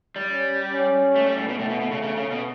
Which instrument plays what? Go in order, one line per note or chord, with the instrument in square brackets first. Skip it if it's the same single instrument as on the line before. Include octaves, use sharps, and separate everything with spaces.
[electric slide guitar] G3
[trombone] C#4
C#4
[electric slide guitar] A3
G3
A2
B2
[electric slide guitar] A2 [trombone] A3
[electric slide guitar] B2
B2
C#3
C#3
C#3
B2